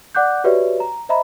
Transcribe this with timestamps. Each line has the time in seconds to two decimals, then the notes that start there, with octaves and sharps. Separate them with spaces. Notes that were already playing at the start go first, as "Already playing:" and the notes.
0.15 D5 F#5 D6 F#6 G6
0.44 F#4 G4 B4 C#5 D5 E5
0.80 A#5
1.09 C5 D#5 E5 A#5 B5